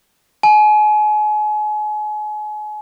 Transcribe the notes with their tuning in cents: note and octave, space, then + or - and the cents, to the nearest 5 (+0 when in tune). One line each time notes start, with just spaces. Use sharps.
G#5 +35